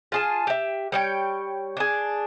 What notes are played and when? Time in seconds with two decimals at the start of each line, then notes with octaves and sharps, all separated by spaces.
0.12 F4 G#4 A5
0.47 G4 E5
0.92 G3 C#5 G5
1.77 D4 G#4